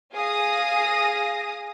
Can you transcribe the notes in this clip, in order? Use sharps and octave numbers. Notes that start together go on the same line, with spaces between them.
G#4 F5 D#6 A#6